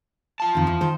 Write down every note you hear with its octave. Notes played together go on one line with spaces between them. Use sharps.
F4 A5
F2 D#3
E2
D#3 C5